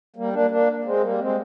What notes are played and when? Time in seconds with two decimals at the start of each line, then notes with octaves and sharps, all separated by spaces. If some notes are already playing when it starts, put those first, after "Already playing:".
0.16 G3 A#3
0.33 A#3 D4
0.50 A#3 D4
0.84 G#3 C4
1.02 G3 A#3
1.18 G#3 C4